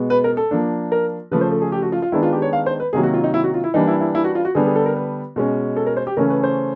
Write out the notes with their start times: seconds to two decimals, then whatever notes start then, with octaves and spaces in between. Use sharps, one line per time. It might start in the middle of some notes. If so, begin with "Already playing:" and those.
Already playing: B2 G#3 B3
0.10 B4
0.24 A#4
0.37 A4
0.51 F3 A#3 D4
0.92 A#4
1.31 C#3 F3 A3 B4
1.41 C5
1.52 A4
1.62 G#4
1.72 G4
1.82 F#4
1.92 F4
2.02 F4
2.12 D#3 G#3 B3 D4 E4
2.23 F4
2.33 G4
2.42 C#5
2.53 F5
2.66 C5
2.80 B4
2.93 C3 D#3 F#3 A#3 G#4
3.03 F#4
3.14 F4
3.24 D#4
3.34 E4
3.44 F#4
3.54 F4
3.64 E4
3.74 E3 G3 A#3 D4 D#4
3.88 E4
4.01 E4
4.15 E4
4.24 F#4
4.35 F4
4.45 F#4
4.55 D3 G3 B3 D4 G#4
4.66 G#4
4.76 A4
4.86 A#4
4.96 B4
5.36 B2 G#3 C#4
5.77 A4
5.86 A#4
5.97 C5
6.07 G4
6.17 C#3 E3 A3 C#4 A#4
6.30 B4
6.43 C5